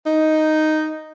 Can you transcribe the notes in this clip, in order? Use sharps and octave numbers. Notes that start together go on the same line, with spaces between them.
D#4